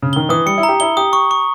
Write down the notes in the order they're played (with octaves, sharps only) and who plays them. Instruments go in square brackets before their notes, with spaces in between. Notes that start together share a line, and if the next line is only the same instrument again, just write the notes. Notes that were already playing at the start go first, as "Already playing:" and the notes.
[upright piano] C#3
[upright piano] D#3 [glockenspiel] G7
[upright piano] E3 [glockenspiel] D#6
[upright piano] G3 [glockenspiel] C#7
[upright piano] E4
[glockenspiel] A#5
[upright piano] G4
[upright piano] E4 [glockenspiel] G7
[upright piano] G4 [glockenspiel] D#6
[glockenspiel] C#6
C#6